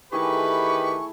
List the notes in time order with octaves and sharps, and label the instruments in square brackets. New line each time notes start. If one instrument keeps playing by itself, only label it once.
[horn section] D#3 G4 B4 [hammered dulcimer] E3 A3 G#4 [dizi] C#6